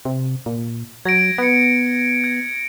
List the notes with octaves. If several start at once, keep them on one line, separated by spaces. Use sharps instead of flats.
C3
A#2
F#3 G#6 A#6 D7
B3 G#6 C#7
G#6